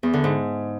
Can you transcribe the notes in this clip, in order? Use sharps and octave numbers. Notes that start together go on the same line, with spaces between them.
E2
D3
G#2